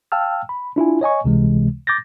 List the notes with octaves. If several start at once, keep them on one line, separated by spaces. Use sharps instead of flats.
F5 G5 A5 E6 F6
B5
D4 E4 F4 G#5
C#5 D#5 G#5 C#6
C#2 C3 E3 G#3
D6 G6 A6 A#6